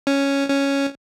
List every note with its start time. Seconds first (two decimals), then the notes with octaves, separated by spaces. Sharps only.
0.07 C#4
0.49 C#4